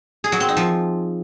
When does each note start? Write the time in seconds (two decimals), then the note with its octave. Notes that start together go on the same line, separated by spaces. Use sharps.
0.24 G#4
0.32 F#3
0.40 C4
0.48 D#4
0.57 F3